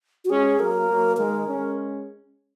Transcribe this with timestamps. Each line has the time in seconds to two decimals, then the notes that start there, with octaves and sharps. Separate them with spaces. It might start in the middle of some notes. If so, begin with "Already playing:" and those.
0.24 F#4
0.29 G#3 C#4 G#4
0.59 F#3 A#3 A#4
0.88 F#3 A#3
1.18 D#3 G#3 A#4
1.48 G#3 C#4